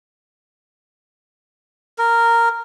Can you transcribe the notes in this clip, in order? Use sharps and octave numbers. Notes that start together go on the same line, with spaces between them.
A#4